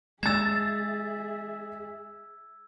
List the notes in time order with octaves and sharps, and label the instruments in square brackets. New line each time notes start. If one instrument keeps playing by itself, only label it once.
[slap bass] G#3 [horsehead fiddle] G#4 E5 [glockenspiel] E6 G#6 [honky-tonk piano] A6 E7